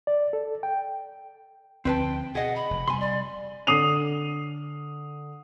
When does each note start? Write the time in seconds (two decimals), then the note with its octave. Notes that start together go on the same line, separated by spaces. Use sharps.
0.07 D5
0.33 A4
0.63 G5
1.85 D2 F3 C4 B4 G5 A5
2.35 B2 G#4 D#5 F#5
2.56 B5
2.71 F1
2.88 C3 F#3 G3 G#5 C6
3.00 D5
3.67 D3 D#6 C7 D#7 F7